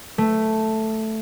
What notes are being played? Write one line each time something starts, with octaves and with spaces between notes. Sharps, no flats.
A3